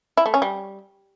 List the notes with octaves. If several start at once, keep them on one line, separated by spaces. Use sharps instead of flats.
E4
A3
C#4
G3